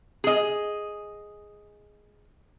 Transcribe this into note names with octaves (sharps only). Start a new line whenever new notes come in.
G#4 D#5